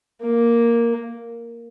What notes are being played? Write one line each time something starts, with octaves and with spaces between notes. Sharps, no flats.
A#3